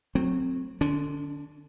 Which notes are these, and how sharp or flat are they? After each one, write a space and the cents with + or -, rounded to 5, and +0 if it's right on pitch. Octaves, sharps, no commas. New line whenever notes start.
F#3 -20 A3 +25 C4 +0
D3 +20 D4 -45